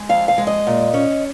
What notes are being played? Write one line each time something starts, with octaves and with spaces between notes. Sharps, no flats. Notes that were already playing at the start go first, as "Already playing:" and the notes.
Already playing: G#3
F2 F5
F5
G#3
D#5
A#2
C#4